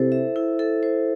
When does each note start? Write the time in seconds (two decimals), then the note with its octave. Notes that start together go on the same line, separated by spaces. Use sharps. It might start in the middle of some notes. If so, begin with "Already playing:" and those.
Already playing: C3 E4 A4 C5
0.12 E5
0.36 E4
0.59 A4
0.83 C5